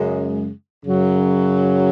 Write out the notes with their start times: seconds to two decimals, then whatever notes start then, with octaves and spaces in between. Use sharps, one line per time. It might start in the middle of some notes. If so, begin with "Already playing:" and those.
Already playing: F#2 C#3 G#3
0.85 F#2 C#3 F#3